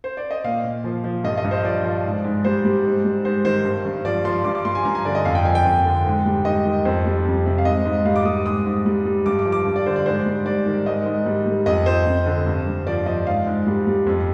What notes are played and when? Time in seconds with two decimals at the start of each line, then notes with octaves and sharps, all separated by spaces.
0.04 C5
0.17 D5
0.31 D#5
0.44 A#2 F5
0.64 A#2
0.84 F3
1.04 F3
1.24 G2 D#5
1.37 D#5
1.44 G2
1.51 C5
1.64 F3 D5
1.84 F3
2.04 G#2
2.24 G#2
2.44 G3 C5
2.65 G3
2.85 G#2
3.05 G3
3.25 G#2 C5
3.44 D#3 C5
3.65 G2
3.85 G2
4.05 F3 D5
4.25 F3 C6
4.44 G2 D6
4.55 D6
4.65 G3 C6
4.75 G#5
4.85 G2 A#5
4.95 G#5
5.05 D3 D5
5.15 D#5
5.25 F2 F5
5.35 G5
5.45 F3 G#5
5.55 G5
5.65 F2
5.85 D3
6.05 G#2
6.25 G3
6.45 G#2 D#5
6.65 D#3
6.85 F2 C5
7.05 G3
7.25 F2
7.46 C3
7.58 F5
7.65 G#2 D#5
7.85 G#2
8.05 G3 F5
8.16 D6
8.25 G3 D#6
8.46 G#2 D#6
8.66 G#2
8.85 G3
9.06 G3
9.26 G2 D6
9.39 D6
9.45 F3
9.52 D6
9.66 G2
9.76 D5
9.86 D3 C5
9.96 D5
10.06 G#2 C5
10.26 G3
10.46 G#2 D5
10.66 D#3
10.86 G#2 D#5
11.06 G#2
11.26 G3
11.46 G3
11.66 F2 D#5
11.86 F3 C5
12.06 F2
12.26 D3
12.46 G2
12.66 G2
12.87 F3 D5
13.06 F3 D#5
13.26 G#2 F5
13.47 G#2
13.67 G3
13.87 G3
14.06 F2